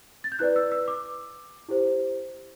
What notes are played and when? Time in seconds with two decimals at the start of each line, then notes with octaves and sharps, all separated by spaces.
0.24 A6
0.32 G6
0.39 E4 B4 D5 F#6
0.56 E6
0.72 E6
0.88 D6
1.68 E4 G4 C5